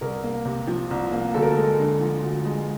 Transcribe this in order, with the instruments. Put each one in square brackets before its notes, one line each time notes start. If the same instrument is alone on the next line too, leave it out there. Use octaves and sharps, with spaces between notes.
[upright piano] C2 A#4
A#3
C3
F3
C2
A#3
D2 A4
A#4
G#3 A4
D3
F3
D2
G#3